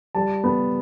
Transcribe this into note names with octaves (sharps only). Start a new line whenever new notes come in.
G3 A5
B3